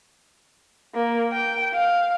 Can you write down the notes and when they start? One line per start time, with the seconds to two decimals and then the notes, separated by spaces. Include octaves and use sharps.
0.94 A#3
1.32 G5
1.74 F5